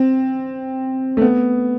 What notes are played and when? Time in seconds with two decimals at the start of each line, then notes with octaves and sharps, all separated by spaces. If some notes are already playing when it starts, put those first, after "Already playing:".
Already playing: C4
1.17 A3
1.21 B3